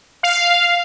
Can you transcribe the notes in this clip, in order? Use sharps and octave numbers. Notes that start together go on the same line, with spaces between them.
F5